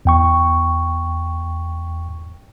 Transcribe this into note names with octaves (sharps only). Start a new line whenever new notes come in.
E2 G5 C#6